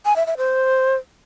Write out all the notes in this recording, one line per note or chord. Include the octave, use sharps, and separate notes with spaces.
G#5
E5
E5
C5